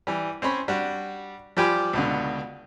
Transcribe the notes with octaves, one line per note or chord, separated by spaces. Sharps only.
E3 G3
C4 C#4 C#5 B5
G3 D4 F#4
F3 G3 G4 G5 G#5 B5
C#2 B2 D3